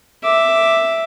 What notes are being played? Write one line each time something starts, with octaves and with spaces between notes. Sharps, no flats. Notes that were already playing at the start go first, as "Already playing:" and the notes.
E5 D6